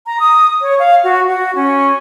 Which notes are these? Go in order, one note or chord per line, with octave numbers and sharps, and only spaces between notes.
A#5
D#6
C#5
F5
F#4
F#4
C#4